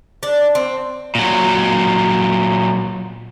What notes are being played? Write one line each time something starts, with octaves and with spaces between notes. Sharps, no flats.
D4
C4
A#2 F#3